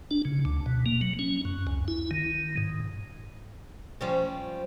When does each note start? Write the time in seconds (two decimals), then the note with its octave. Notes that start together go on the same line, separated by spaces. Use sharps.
0.11 D4
0.25 C#3
0.45 D2
0.66 B2
0.86 A#3
1.02 F#3
1.19 C#4
1.45 F#2
1.67 C#2
1.88 E4
2.11 D#3
2.57 G#2
4.01 F3 G3 C#4